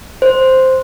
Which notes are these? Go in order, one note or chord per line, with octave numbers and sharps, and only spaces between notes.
C5